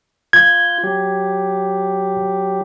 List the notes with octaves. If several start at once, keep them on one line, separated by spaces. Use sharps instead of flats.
F4 G6 G#6
F#3 G4